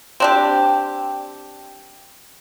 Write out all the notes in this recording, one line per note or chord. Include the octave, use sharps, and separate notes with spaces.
C4 D4 G4